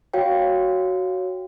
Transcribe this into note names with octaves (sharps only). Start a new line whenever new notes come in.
F#4 C#5 F5 G5